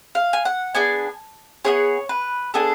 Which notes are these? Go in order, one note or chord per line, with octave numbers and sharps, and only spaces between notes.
F5
G#5
F#5
B3 D4 G#4 G#5
B3 D4 G#4 C#5
B4
B3 D4 G#4 A4